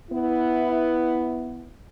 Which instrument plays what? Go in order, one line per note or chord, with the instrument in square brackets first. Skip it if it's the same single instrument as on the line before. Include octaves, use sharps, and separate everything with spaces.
[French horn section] B3 E4